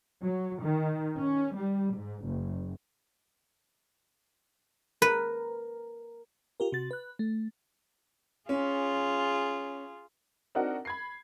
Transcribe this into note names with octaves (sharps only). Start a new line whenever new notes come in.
F#3
D#3
C#4
G3
G#2
F#1
A#4 B4
F4 G4 A#4
C3 F#4 A6
B4 F#6
A3
C#4 F4 G#4
C4 D4 D#4 F#4 A#4 F#5
B5 G#6 C7